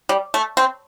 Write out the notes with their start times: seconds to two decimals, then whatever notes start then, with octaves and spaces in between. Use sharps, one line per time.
0.09 G3
0.34 A3
0.57 C4